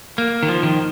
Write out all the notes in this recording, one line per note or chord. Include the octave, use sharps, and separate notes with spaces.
A#3
D#3
F3
D#3